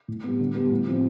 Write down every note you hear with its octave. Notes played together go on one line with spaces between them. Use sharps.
A2
G3 B3
D3
G3 B3
A2
F3 C4